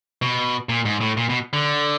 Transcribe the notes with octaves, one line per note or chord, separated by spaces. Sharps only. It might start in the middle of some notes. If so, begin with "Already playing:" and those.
B2
A#2
G#2
A2
A#2
B2
D3